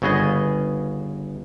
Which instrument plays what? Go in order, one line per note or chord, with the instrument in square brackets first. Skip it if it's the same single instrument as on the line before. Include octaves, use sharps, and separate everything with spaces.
[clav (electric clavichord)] G1 C#3 B3 G#4 D#5